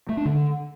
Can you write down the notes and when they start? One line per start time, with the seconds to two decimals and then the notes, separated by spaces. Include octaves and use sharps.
0.09 A3
0.17 D4
0.25 D3